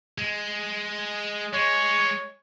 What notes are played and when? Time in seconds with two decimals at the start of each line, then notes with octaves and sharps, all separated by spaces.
0.18 G#3
1.54 G#3 C#5